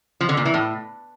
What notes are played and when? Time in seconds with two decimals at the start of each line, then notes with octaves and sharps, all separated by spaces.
0.21 F3
0.29 D3
0.37 A#2
0.45 E3
0.54 A2